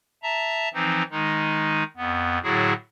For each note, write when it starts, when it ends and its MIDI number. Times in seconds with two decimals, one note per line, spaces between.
0.23 0.69 76
0.23 0.69 81
0.23 0.69 82
0.74 1.03 52
0.74 1.03 53
0.74 1.03 60
0.74 1.03 63
1.11 1.83 51
1.11 1.83 56
1.11 1.83 63
1.97 2.39 41
1.97 2.39 59
2.43 2.73 45
2.43 2.73 50
2.43 2.73 54
2.43 2.73 64
2.43 2.73 66
2.43 2.73 68